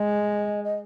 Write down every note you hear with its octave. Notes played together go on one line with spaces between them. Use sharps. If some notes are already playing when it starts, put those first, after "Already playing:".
Already playing: G#3 D#5
D#5